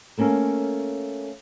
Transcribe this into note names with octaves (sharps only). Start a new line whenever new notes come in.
A3 A#3 C#4 A4 A#4